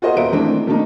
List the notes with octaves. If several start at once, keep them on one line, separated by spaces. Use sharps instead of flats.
F4 F#4 G#4 A#4 C5 D#5
D#1 B4 C5 E5 D7
D#3 E3 G#3 A3 C4 D4
B2 D#3 A3 A#3 D4 D#4